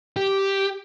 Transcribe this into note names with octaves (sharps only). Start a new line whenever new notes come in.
G4